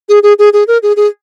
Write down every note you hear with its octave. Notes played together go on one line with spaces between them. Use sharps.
G#4
G#4
G#4
G#4
A#4
G#4
G#4